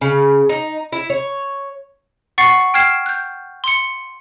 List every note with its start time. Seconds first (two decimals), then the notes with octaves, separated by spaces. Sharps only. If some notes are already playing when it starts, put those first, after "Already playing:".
0.01 C#3
0.49 D#4
0.92 E4
1.10 C#5
2.38 F#5 C#6 A6 C7 C#7
2.74 G5 F6 G#6 C7 E7
3.06 F#6 G6
3.64 C6 C#7